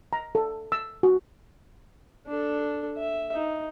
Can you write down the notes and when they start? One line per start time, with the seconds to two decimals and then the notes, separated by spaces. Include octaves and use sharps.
0.13 A#5
0.35 A4
0.72 E6
1.03 F#4
2.27 D4 A4
2.98 E5
3.34 D#4